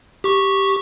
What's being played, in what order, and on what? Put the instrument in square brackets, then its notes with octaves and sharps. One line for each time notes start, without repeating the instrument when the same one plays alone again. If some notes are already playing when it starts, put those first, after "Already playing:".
[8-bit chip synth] G4 C#6